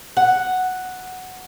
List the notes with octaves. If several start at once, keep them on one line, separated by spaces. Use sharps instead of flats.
F#5